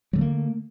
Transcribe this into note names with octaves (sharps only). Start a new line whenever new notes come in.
D3 F#3 A3 A#3